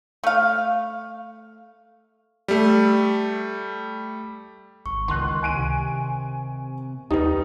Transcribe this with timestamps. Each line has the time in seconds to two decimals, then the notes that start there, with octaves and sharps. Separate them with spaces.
0.24 A3 F5
2.48 G3 A3
4.86 G#1 C#6
5.08 C#2 D#3 C6 F#6
5.43 G#5 D7 D#7
5.54 C3
7.11 D#2 G3 D#4 G4 B4